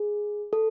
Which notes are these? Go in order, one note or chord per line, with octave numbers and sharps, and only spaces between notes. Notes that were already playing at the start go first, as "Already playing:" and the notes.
Already playing: G#4
A4